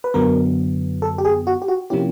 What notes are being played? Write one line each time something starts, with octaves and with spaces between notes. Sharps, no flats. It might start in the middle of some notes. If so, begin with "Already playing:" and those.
B4
F#2 D3 F#3 B3 A#4
A4
G4
G#4
F#4
G4
F#4
C3 F3 A#3 C#4 E4 G4